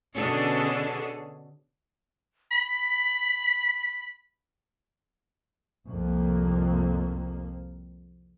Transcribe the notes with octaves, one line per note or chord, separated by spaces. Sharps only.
B2 D3 C#4 D4 G#4 A4
B5 B6
C2 F2 A#3